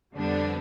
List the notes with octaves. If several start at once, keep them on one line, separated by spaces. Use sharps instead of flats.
F2 D3 G3 B3 D4